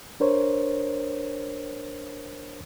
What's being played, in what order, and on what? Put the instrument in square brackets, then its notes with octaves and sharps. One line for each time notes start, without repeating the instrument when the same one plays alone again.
[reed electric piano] D4 A#4 C5 C#5